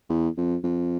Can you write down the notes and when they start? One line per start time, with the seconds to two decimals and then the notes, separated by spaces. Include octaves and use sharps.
0.10 E2
0.37 F2
0.64 F2